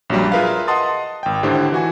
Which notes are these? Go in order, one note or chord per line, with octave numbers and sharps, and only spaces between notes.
A#1 F#2 F#3 G3
F4 G#4 A#4 B4 E5 F5
D#5 F#5 A5 C6 D#6 A6
G#1 G5
A2 D3 D#3 G4 C5 G5
E3 F#4 G#5